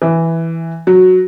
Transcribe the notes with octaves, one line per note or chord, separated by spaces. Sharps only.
E3
F#3